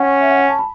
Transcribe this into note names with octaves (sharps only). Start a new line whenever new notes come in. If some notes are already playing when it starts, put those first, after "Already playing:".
Already playing: C#4 F#5
E5
F#5
G#5
A5
B5